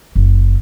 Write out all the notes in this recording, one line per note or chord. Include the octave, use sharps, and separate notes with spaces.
F#1